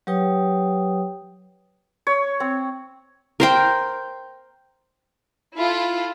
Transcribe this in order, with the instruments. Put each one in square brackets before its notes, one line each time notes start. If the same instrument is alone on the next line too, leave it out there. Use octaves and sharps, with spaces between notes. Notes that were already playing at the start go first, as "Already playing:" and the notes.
[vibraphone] F#3 G4 B4 C#5 G5 D#6
[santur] C#5
C4
[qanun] A#4 C5 G5
[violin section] E4 F4 A4